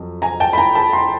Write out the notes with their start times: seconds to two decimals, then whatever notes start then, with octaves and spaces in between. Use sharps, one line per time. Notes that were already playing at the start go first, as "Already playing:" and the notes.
Already playing: F2 F#3
0.22 G#5 A#5
0.40 G5 A5
0.53 B5
0.58 G#5 A#5
0.75 A5 B5
0.93 A#5 C6